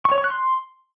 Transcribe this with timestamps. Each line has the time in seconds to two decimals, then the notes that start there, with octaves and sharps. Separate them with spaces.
0.05 C#6
0.12 C#5
0.18 C#6
0.24 F#6
0.30 C6